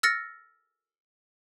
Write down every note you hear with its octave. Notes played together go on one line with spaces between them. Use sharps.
E6 F6 A6 A#6 C#7